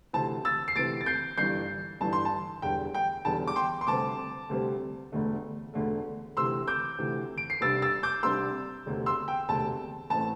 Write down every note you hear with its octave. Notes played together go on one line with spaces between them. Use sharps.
D2 C3 E3 C4 A5
E6 A6
C7
D2 C3 E3 C4 A6 D7
A6
G6 C7
G1 G2 E3 G3 G6 C7
G1 G2 E3 G3 A5
C6
A5
E1 E2 D3 G3 G5
G5
E1 E2 D3 G3 A5
D6
G5 C6
C6
D2 C3 G3 C4 A5 D6
D2 C3 G3 C4
E1 D2 D3 A3
E1 D2 D3 A3
D2 C3 E3 C6 E6
D6 G6
D2 C3 E3
D7
C7
C2 C3 G3 D4 E6 A6
E6 A6
D6 G6
C2 C3 G3 D4 C6 E6
E1 D2 C3
C6 E6
G5
E1 D2 C3 A5
A1 A2 A3 C4 A5